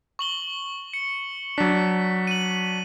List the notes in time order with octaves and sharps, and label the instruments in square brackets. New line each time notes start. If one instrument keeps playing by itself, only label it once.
[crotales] C#6 F#7 G7
C#7
[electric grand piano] F#3 D4 [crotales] B6
[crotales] D#7 F#7